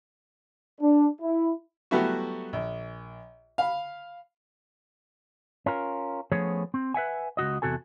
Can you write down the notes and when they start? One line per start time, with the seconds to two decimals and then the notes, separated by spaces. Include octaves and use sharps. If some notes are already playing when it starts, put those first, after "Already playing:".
0.81 D4
1.21 E4
1.91 F#3 G3 A3 B3 E4 F#4
2.53 A#1
3.58 F5 B5
5.66 C#4 F4 A#4
6.32 F3 A3 B3 C#4 G#4 C#5
6.74 C4
6.94 B4 E5 F#5 G#5
7.37 C#2 C3 F#4 D#5
7.62 E2 G2 C3 F#4 A4 G#5